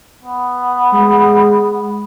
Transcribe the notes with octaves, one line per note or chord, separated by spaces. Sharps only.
B3
G#3